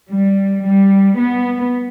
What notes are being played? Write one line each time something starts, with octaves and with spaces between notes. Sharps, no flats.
G3
G3
B3